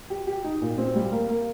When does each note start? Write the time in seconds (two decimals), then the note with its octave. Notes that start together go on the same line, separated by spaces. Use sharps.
0.10 G4
0.27 G4
0.44 D#4
0.61 A#2
0.78 C4
0.95 G3
1.12 A#3
1.29 A#3